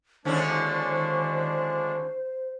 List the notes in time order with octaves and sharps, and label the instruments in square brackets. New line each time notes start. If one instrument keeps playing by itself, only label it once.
[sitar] D#2 D3 C#4 [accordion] F3 G#3 D4 [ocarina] C5